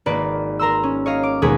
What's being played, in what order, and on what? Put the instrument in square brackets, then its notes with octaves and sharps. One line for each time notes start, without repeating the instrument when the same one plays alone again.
[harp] G#1 A#3 B4 D5
A#4 A#5 C6 E6
C#4
C#5 D#5 F5
D6
D#2 B2 G#3 G#4 G#6 B6